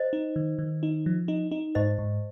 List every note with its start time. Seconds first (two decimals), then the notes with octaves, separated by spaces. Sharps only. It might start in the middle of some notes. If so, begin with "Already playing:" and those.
Already playing: C5 D#5
0.13 D#4
0.36 D#3
0.59 D#3
0.83 D#4
1.06 F3
1.28 D#4
1.51 D#4
1.75 G#2 C5 D#5
1.98 G#2